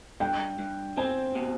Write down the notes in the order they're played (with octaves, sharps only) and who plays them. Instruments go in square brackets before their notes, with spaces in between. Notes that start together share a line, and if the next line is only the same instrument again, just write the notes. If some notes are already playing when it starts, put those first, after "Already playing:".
[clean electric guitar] G2 [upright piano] G5
[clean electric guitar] G2
[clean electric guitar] C4 [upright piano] G#5
[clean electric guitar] B2